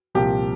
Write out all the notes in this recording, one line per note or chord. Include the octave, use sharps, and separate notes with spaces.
C2 A#2 F3 G4